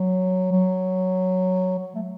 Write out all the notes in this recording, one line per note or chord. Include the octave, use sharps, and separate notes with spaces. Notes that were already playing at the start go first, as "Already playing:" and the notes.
Already playing: F#3
F#3
F#3
A3